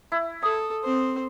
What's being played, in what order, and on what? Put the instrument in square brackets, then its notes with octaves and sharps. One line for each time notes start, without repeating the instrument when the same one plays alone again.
[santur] E4
[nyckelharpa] A4 [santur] D#6
[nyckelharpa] C4 C5